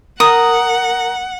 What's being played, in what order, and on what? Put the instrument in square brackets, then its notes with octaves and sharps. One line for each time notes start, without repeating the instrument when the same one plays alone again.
[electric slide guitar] A#4 [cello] F#5 [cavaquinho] D#6